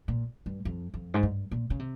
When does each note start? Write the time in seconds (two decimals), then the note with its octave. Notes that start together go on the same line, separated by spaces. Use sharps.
0.08 A#2
0.46 G2
0.65 F2
0.94 F2
1.14 G#2
1.23 G2
1.51 A#2
1.70 C#3
1.79 C3